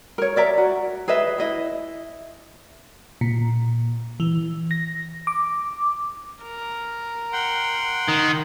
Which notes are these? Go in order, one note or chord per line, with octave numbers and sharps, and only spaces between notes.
A#4 C#5
A#4 D5 E5 A#5
F#4
G#4 B4 D#5 E5
E4 D#5 E5
A#2
E3
A#6
D6
A#4
F#5 G5 C6
D#3